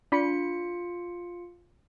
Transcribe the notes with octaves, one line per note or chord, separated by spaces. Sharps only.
D4 F4 B5 C#7